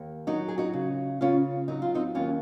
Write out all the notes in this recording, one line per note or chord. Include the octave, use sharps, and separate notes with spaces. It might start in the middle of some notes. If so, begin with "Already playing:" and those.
Already playing: D#2
F#3 D#4 F#4
G#4
D#4 F#4
C#3
C#3 C#4 F4
F#3 D#4
F4
C4 D#4
D#2 C#4 F4